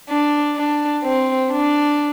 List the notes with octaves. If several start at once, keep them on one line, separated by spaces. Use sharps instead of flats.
D4
D4
C4
D4